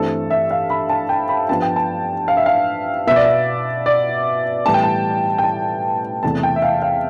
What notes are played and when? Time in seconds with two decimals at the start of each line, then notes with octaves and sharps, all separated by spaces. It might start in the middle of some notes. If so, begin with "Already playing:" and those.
Already playing: G2 E3 A3 C4 A4
0.31 E5
0.51 F5
0.70 B5
0.90 A5
1.09 G5
1.29 B5
1.49 G2 F3 B3 A5
1.62 G5
1.76 A5
2.28 F5
2.37 E5
2.46 F5
3.07 B2 B3 E5
3.16 D5
3.24 E5
3.86 D5
4.66 A2 E3 G3 B3 A5
4.74 G5
4.83 A5
5.38 G5
5.44 A5
6.23 E2 C3 E3 A3 A5
6.43 G5
6.56 E5
6.62 F5
6.82 F5